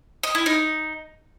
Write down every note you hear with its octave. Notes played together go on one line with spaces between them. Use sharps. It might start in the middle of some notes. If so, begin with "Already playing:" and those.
D#5
E4
D#4